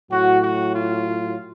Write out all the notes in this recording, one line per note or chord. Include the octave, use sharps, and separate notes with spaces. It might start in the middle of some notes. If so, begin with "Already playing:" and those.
A2 F#3 F#4
F#4
F4